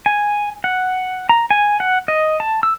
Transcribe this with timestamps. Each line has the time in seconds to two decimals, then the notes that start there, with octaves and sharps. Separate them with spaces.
0.06 G#5
0.64 F#5
1.29 A#5
1.50 G#5
1.80 F#5
2.08 D#5
2.40 A5
2.63 E6